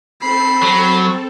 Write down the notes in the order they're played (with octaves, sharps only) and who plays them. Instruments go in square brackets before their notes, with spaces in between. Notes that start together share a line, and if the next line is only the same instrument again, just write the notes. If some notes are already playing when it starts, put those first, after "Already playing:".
[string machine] C4 A4 [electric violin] B5 C7
[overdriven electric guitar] F#3